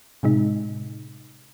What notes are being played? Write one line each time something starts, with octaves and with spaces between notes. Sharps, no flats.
A2 C3 G#3 D#4